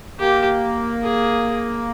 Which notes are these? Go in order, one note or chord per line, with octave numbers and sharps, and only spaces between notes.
A#3 G4
G#4